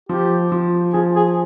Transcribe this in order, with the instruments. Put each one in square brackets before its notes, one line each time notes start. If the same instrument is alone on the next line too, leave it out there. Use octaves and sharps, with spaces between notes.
[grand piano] F3 [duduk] G4
[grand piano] F3
[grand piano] F3 [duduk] G#4
[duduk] G#4